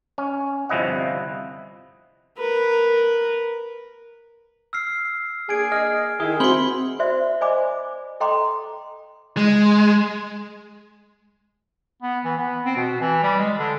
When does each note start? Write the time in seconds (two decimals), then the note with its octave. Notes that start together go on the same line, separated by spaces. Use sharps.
0.18 C#4
0.69 G1 C3 F3 E4 D#5 F#5
2.38 A#4 B4
4.73 E6 F6 C7
5.49 A#3 D4 G#4 G#5 G#6 D7
5.72 D#5 F6
6.20 D#3 E4 G#4
6.40 C4 F#4 B5 C6 F#7 G7
6.99 F#4 C5 D5 E5
7.41 C5 D5 D#5 G#5 B5 D6
8.20 A4 D#5 G5 A#5 C6 D6
9.37 G#3
12.02 B3
12.25 E3
12.38 B3
12.64 C4
12.76 B2
13.00 E3
13.23 G3
13.38 G#3
13.58 D3